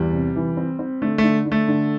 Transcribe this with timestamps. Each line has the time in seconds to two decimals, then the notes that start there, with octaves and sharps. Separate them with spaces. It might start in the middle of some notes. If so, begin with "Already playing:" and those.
Already playing: E2 G3
0.13 C3
0.36 E3
0.57 C4
0.79 C4
1.02 D3 A3
1.18 A3
1.23 D3
1.45 D3
1.52 A3
1.68 D3